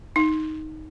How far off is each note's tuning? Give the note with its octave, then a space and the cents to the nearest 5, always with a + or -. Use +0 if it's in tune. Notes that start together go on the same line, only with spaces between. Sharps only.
D#4 +5